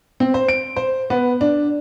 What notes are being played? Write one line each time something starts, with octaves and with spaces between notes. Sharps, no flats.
C4
C5
D7
C5
B3
D4